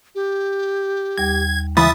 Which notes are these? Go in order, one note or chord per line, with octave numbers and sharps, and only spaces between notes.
G4
D#2 G3 G#6
C#2 E3 E5 B5 D#6 A6